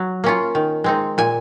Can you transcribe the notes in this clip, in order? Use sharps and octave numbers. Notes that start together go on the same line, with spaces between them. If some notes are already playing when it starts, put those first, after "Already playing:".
Already playing: F#3
A#3 C#4 F4
D#3
G#3 C4 D#4
A#2 G#5